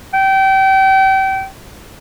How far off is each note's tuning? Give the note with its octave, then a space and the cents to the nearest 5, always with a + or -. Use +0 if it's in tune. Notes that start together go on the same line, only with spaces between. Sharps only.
G5 -30